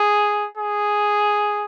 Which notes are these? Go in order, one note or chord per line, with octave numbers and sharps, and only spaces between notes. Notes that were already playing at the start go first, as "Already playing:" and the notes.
Already playing: G#4
G#4